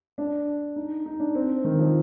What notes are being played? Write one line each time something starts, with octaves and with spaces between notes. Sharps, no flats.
D4
D#4
D#4
D4
C4
D#3
F3